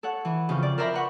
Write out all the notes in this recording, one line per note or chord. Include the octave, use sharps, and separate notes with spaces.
A4 C#5 F#5
E3
F2 C#3
D5
A#4 C5 D5 E5 A#5 B5
B4 F#5 C#6